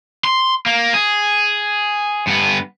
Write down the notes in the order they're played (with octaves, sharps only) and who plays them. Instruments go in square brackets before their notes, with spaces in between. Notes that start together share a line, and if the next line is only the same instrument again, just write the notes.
[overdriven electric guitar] C6
A#3
G#4
G2 B3